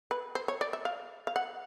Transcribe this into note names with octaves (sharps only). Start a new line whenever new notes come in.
B4
C5
C#5
D5
E5
F5
F5
F#5